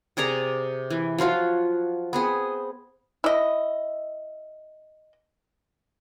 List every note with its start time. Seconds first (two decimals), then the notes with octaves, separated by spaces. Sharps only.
0.17 C3 G#4 D5 A#5
0.90 E3
1.18 F3 F#3 F4 F#4
2.13 B3 C4 G#4
3.24 E4 D#5